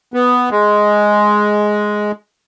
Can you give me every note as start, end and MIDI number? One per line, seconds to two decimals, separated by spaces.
0.14 0.49 59
0.51 2.12 56